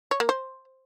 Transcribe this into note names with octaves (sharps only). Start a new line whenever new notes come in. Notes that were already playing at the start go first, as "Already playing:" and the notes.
C#5
A#3
C5